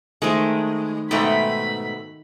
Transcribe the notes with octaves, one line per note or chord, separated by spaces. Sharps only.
D#3 G#3 A3 C5
G#2 B2 A3 G5 B5